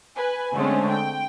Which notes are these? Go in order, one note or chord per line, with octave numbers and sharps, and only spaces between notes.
B4 G#5
D3 G#3 A3 C4 C#4
G5